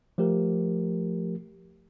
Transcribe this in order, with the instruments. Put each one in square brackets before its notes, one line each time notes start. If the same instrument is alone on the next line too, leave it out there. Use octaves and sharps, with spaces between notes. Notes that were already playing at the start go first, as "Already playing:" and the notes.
[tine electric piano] F3 A3 G4 A#4